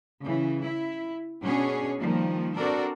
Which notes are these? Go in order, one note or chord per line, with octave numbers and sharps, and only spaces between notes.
C#3 E3
E4
B2 C#4 D4 G#4 C#5
D#3 F3 G3 A#3
C4 D4 F#4 A4 A#4 D5